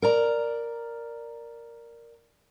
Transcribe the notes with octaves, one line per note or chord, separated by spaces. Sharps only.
A#4 D5 A#5